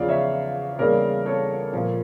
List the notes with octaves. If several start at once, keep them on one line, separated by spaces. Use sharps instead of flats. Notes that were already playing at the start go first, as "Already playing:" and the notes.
Already playing: E2 C#3 F3 D5 F5
C#5 E5
E2 C#3 G3 A#3 A#4 D5
A4 C#5
A#2 F3 A#3